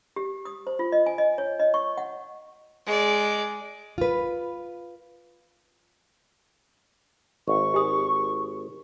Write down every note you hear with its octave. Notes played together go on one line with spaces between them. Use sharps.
G4
D#6
C5
F4
D#5
G#5
D#5
C#5
D#5
C#6
F#5
G#3 D5
F4 B4
G#1 C#6
G4 G#5 D#6